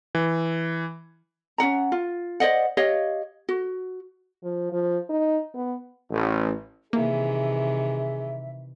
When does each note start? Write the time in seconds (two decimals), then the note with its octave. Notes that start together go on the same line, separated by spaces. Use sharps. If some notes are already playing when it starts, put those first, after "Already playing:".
0.15 E3
1.58 C#4 D#4 F#5 A#5
1.92 F4
2.40 C5 D5 D#5 F#5
2.77 G4 C#5 D#5 F5
3.49 F#4
4.43 F3
4.72 F3
5.10 D#4
5.54 B3
6.11 A1
6.93 C3 D#3 E3 A#3 G#4 E5